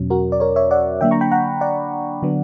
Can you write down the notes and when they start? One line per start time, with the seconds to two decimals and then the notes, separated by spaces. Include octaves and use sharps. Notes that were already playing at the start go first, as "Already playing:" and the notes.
Already playing: E2 B2 F#3 C#4
0.10 F#4 A#4
0.32 D5
0.40 A#4 C#5
0.56 C#5 E5
0.71 D5 F#5
1.01 D3 F#3 A#3 D4 E5 G5
1.11 A#5 C#6
1.21 G5 B5
1.32 F#5 A#5
1.61 D5 F#5
2.22 D3 F#3 B3 D4